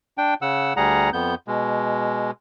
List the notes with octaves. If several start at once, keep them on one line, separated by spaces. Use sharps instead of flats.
D4 G5
C#3 F#5 E6
D2 G3 G#4 F#5 A#5
F2 B3 G6
B2 G#3